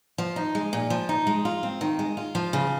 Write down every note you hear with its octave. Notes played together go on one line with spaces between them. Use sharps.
F3
D#4
G#3
A#2
F3
D#4
G#3
F4
C4
D#3
G#3
F4
F3
C#3